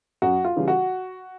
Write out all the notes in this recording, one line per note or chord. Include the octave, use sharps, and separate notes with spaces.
F#2 F#4
F4
C#3 E3 G3
F#4